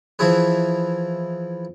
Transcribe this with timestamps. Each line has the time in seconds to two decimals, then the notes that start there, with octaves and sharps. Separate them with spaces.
0.19 E3 F3 E4 G#4 B4